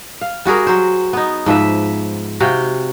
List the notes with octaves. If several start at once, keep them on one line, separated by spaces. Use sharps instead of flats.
F5
G3 F#4 G#4 A#4
F#3 C5
B3 D#4
G#2 F3 B4 E5
C3 F#4 F5 G5